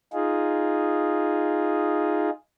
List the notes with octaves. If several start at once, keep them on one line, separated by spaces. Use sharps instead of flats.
D#4 F4 G#4